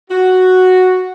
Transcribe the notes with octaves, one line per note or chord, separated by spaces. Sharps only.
F#4